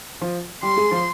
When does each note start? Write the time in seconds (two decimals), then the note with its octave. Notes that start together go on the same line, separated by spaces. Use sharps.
0.21 F3 F4
0.63 G3 G4 C6
0.76 G#3 G#4
0.91 F3 F4